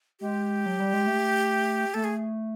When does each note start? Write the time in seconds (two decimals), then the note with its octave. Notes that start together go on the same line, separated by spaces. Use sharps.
0.20 G#3 G4
0.66 F#3
0.80 G3
0.93 G#3
1.07 A3
1.94 A3 A4
2.04 G#4